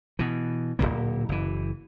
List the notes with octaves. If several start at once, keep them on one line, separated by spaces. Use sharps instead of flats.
B2 E3
D1 G2 A#2 A#3
F#1 E3